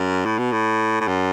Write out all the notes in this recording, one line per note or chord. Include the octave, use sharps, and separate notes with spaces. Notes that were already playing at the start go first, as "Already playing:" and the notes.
Already playing: F#2
A2
B2
A2
A2
F#2